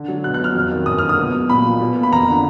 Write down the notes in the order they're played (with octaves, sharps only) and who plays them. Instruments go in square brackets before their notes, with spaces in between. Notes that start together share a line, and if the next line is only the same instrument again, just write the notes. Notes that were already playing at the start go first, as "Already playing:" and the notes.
Already playing: [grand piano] D3
F#3
[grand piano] B2 [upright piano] F#6
[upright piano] F#6
[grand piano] F#3 [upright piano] F6
[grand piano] F2
D#3
[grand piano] F#2 [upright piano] D#6
[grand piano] D3 [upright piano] F6
[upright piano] D#6
[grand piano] B2
F#3
[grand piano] A#2 [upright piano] B5
[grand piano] F3
B2
A#3
[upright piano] B5
[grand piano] F2 [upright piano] A#5
[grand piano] D3